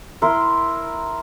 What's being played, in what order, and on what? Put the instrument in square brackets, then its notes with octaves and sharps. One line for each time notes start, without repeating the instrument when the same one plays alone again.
[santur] E4 A#4 C6